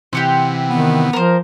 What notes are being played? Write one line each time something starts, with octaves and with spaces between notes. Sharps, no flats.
C3 E3 G4 F#5 C6
D#3 B3
F3 A#4 C5